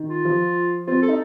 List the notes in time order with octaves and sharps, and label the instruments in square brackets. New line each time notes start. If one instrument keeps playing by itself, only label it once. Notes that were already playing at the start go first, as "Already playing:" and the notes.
Already playing: [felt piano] D#3
[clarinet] F4
[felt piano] F3
[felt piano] C4 [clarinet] F4
[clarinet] A4
[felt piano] D#4